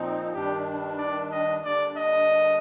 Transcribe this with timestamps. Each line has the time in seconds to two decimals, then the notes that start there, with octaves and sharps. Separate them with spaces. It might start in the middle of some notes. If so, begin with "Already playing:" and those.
Already playing: A#2 F3 C4 D#4
0.34 G2 D#3 G3 D4 G4
0.98 D5
1.31 D#5
1.64 D3 G3 A#3 D4 D5
1.97 D#5